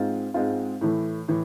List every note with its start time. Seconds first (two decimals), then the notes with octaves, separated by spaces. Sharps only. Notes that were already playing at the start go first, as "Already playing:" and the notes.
Already playing: G#2 G#3 C4 F4
0.34 G#2 G#3 C4 F4
0.81 A2 E3 A3
1.28 A2 E3